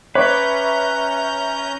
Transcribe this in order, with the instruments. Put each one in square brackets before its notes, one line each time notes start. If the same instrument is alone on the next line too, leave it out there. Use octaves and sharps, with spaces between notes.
[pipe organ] C#4 A#5 G6 [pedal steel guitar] B4 [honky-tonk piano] C#5 D6 [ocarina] E5